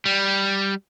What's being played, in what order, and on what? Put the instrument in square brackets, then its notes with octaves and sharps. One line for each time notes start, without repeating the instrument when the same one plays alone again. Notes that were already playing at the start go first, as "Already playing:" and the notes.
[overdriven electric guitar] G3